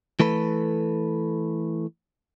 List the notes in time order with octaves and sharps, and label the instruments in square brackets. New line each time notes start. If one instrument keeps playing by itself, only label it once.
[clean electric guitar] E3 A3 A4 B4